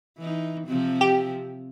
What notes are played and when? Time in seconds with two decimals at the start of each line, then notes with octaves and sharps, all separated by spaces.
0.18 E3 D#4
0.67 C3 F3 C4
1.01 G4